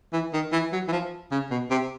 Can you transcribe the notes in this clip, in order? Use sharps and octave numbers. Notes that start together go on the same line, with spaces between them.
E3
D#3
E3
F#3
E3
F3
C#3
B2
C3